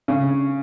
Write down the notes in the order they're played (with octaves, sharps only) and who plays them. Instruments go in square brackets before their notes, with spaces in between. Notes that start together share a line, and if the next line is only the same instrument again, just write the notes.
[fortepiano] C#3